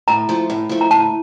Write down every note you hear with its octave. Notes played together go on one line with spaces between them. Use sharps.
A2 A#5
F3 A3
A2
F3 A3
A#5
A2 A5